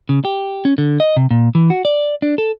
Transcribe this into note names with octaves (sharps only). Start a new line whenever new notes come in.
C#3
G4
C#4
D3
D#5
C3
A#2
E3
F#4
D5
D4
A4